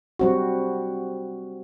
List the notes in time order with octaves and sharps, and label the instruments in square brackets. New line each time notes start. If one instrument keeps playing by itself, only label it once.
[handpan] G3 C4 F#4